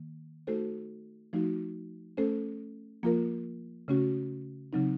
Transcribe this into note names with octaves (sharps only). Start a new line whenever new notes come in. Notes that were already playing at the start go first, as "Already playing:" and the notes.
Already playing: D#3 A#3
A3 D#4 F#4 A4 C5
F3 A3 D#4 F#4
A3 C#4 A4 C5
F3 A#3 F4 A#4
C#3 A3 C#4 F#4
C#3 F#3 C4 D#4